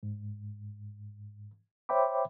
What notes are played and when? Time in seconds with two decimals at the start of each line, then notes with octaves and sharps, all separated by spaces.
0.03 G#2
1.89 C5 C#5 E5 G5 B5 D6